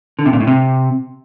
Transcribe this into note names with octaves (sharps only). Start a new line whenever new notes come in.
D3
C3
A#2
A2
C3